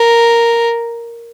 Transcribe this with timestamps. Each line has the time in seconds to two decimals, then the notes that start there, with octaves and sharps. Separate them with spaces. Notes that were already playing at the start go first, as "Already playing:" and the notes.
Already playing: A#4